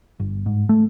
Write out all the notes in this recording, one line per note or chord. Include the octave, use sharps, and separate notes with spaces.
G1
G#2
A3